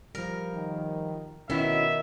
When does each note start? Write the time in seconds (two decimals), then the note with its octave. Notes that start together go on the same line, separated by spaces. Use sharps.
0.15 F3 G3 A#4
0.54 D#3
1.50 B2 D#3 C#4 E4 F#4 E5